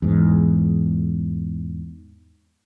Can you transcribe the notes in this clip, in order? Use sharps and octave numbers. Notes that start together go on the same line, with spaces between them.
E2 G#2